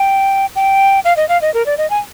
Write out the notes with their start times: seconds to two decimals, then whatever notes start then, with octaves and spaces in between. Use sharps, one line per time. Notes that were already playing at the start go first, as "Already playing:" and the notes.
Already playing: G5
0.56 G5
1.05 F5
1.17 D#5
1.29 F5
1.42 D#5
1.54 A#4
1.66 D5
1.78 D#5
1.90 G#5